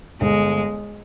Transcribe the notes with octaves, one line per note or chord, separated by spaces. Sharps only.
G1 G#3